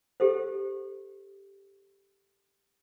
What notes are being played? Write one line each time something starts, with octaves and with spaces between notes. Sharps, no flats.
G4 A4 C5